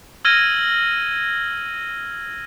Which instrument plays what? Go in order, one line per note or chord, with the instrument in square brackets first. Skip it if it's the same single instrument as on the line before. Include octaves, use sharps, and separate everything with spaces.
[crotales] E6 F6 G#6 A#6 D#7 G7